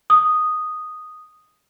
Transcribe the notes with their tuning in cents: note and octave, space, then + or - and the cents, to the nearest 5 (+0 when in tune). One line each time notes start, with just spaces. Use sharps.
D#6 -5